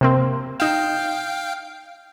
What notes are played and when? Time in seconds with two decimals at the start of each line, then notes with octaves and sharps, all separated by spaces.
0.01 C3 A#3 C4
0.60 D#4 F5 G5 E7